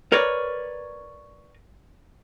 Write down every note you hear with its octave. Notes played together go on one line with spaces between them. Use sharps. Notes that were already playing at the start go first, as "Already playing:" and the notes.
A#4 B4 C#5 D5